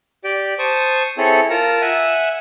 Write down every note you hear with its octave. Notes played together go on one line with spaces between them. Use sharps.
G4 D5 G5
C5 A5 C#6 D#6
C4 E4 G#4 A4 C#5
F4 A#4 A5 A#5
E5 F#5 G#5 E6